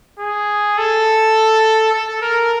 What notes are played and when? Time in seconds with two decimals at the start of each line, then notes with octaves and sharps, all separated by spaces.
0.20 G#4
0.78 A4
1.93 A4
2.22 A#4